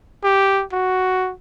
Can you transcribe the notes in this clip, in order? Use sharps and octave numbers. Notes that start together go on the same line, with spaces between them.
G4
F#4